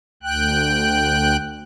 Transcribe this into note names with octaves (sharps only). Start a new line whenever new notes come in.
D2 G5 F#6